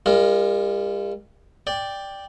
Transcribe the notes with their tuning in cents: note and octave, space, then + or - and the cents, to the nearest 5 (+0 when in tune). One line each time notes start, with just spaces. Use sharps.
G3 +45 F4 -25 A#4 +0
D5 +0 G5 +5